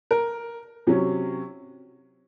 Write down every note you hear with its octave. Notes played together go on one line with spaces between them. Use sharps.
A#4
C3 F#3 C#4